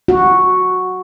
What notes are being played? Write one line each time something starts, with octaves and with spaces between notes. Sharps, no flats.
F#4